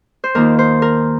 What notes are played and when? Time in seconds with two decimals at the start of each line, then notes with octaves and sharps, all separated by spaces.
0.24 C5
0.35 D#2 D#3 A#3 F4 A#4
0.59 C5
0.82 A#4